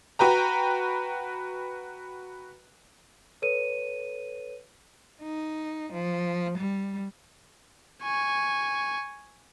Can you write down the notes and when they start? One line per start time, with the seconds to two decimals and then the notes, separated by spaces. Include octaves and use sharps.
0.19 F#4 B4 G5 A#5
3.42 A4 B4 C#5 D#7
5.23 D#4
5.93 F3
6.58 G3
8.03 G#5 C#6